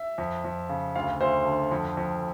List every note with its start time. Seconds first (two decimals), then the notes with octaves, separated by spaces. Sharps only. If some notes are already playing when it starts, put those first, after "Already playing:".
Already playing: E5
0.18 F2
0.45 F2
0.69 C#3
0.96 D2 F5
1.20 D2 C5
1.45 D3
1.72 F2
1.97 F2